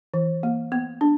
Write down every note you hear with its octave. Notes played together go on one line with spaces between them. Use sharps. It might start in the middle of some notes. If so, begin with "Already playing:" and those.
E3
A#3
B3
D4